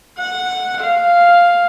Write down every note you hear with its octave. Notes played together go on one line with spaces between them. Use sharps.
F#5
F5